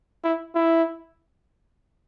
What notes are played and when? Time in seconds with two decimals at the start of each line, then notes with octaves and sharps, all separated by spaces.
0.23 E4
0.55 E4